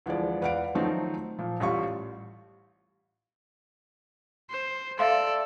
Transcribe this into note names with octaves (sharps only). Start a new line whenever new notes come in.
D2 E3 F3 G#3 D5
E2 B4 D5 F5 F#5 D7
D#3 F3 F#3 A3 C4 D#4
A#2 F3
A1 G3 F4 C#6
C5
A4 D5 E5 F5 C6